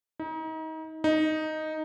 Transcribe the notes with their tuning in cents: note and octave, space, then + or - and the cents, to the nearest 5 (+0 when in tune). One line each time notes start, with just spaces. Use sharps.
D#4 +30
D#4 +0